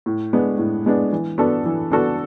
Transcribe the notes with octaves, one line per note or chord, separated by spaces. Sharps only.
A2
G#3 B3 D4
A2
G#3 B3 D4
E3
B3 D4 F#4 A4
E3
B3 D4 F#4 A4